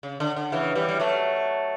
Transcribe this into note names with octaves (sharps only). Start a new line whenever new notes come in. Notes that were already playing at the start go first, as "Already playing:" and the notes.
C#3
D3
D3
C#3 E3
E3 G3
G3
F#3 A3